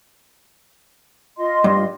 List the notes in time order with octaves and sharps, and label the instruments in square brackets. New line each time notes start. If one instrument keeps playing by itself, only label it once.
[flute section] F4 D#5 C6
[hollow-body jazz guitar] G2